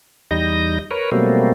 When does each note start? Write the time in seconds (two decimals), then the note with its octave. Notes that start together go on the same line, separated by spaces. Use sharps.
0.31 E2 G3 D#4 D#5 A#6
0.91 A#4 B4 C#5
1.12 B2 F#3 G3 A3 A#3 C4